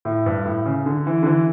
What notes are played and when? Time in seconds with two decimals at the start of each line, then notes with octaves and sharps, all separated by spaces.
0.05 A2
0.26 G2
0.45 A2
0.66 C#3
0.86 D3
1.07 E3
1.23 D3
1.26 E3